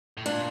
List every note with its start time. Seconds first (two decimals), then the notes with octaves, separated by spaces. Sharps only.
0.17 A2
0.26 A#2 D4